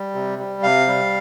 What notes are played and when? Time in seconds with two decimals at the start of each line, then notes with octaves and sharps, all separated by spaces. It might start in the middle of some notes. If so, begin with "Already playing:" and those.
Already playing: G3
0.15 C3
0.39 G3
0.63 C3 F5
0.87 G3